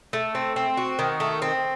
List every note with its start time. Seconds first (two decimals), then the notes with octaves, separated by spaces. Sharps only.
0.13 A3
0.35 C4
0.56 C4
0.77 F#4
0.99 D#3
1.20 A3
1.42 C4